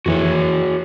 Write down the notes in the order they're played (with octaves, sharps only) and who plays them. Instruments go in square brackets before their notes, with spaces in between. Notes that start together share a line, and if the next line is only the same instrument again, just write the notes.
[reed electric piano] F2 E3 [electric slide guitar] F#4 G#4 C#5